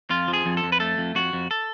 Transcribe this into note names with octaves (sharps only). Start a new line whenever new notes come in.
F2 F4
F3
G#4
F2
A4
F2
B4
A3 A4
F2
F2 F#4
F2
A4